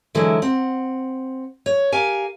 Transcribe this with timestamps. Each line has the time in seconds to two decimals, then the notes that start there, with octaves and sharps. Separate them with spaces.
0.15 D3 E3 F#3 G#3 E4
0.42 C4 F#5
1.66 C#5
1.92 G4 A#4 F5 G#5